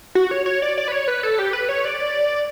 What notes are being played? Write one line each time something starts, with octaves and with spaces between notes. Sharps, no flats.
F#4
C#5
C#5
D5
D5
B4
C#5
B4
A4
G4
B4
C#5
D5